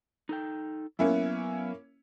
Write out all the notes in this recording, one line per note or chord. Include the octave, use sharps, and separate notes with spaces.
D#4 A4 G5
F#3 A#3 B3 C#4 E4